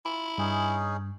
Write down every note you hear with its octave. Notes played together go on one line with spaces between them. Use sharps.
E4 F4
G2 C#4 D#4 G#4